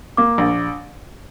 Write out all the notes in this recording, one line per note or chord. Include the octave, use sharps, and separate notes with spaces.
A#3 D6
A#1